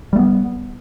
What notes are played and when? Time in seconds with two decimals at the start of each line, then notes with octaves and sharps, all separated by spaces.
0.13 G3
0.16 A3
0.19 B3